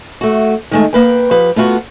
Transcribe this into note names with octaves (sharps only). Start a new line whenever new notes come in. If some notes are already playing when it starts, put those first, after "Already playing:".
A3 F#4
D#3 G#3 A3
A#3 B4 G5
F3 G4 B4
A3 B3 F4 F#4